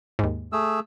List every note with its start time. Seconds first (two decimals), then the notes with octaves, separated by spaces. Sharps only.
0.19 D#2 G#2
0.52 A3 G#4 E6